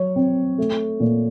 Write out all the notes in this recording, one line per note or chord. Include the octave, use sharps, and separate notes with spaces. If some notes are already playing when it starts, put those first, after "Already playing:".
Already playing: F#3 C#5
C4
A3
A#2